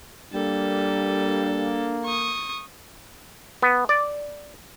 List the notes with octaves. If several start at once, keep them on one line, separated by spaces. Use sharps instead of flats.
G3 A#3 D4 A4
C#6 D#6
B3
D5